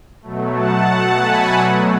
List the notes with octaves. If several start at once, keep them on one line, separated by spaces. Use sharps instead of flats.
B2 F#3 A3
F#5 A5
F#5 A5
G#5 B5
B2 F#3 A3 D5 F#5